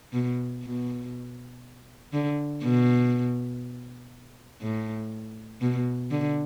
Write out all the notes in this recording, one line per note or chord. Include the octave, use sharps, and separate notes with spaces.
B2
B2
D3
B2
A2
B2
D3